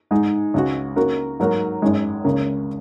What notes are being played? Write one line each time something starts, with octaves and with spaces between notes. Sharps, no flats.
G#2 G#3 D#4 G#4
C#2 C#3 G#3 F#4
C#3 A#3 F#4 A#4
G#2 F#3 A#3 F#4 A#4
G#1 F#2 D#3 G#3
C#2 C#3 A#3